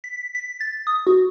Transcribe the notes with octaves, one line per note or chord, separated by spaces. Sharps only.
B6
B6
A6
D#6
F#4